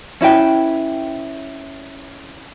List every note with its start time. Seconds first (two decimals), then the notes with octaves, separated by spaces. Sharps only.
0.21 C#4 E4 B4 G5